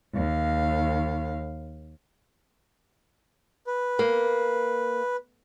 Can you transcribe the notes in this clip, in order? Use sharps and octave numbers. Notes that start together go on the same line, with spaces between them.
D#2 F5
B4
A#3